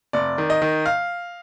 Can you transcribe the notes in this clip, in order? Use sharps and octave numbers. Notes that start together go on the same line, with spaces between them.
F1 D5
D#3
D#5
D#3
F5